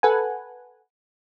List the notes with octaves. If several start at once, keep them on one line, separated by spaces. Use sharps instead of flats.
A4 B4 F#5 G#5